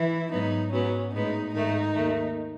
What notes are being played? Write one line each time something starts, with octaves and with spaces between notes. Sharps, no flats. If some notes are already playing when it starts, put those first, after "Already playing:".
Already playing: E3 E4
G#2 F#3 B3 D#4
G#2 F#3 B3 C#4
A2 G#3 B3 D#4
G#2 D#3 A3 D#4
D#2 D#3 A3